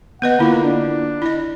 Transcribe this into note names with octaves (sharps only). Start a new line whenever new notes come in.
B3 B4 D#5 F#5
D3 A#3 E4 F4
D4
E4 D#5